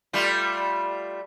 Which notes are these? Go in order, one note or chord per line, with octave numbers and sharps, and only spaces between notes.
G3 A3 F4